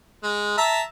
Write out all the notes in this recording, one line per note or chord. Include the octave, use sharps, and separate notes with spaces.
G#3
E5 A5 A#5